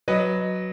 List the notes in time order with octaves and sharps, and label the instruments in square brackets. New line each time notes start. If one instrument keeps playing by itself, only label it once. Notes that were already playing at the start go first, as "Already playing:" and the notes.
[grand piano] F#3 B4 D#5